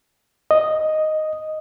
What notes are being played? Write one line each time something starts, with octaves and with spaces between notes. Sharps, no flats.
D#5